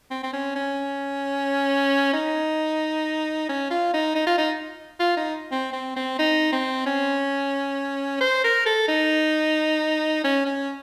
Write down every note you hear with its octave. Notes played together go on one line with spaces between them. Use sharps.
C4
C4
C#4
C#4
D#4
C#4
F4
D#4
D#4
F4
D#4
F4
D#4
C4
C4
C4
D#4
C4
C#4
C5
A#4
A4
D#4
C#4
C#4